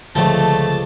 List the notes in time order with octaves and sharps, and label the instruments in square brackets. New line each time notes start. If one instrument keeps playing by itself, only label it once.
[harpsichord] C#2 C4 F4 [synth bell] D3 F3 [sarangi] A3 [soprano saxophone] A5